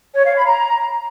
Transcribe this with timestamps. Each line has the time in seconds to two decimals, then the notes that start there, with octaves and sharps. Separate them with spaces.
0.14 C#5
0.24 F5
0.35 B5
0.45 A#5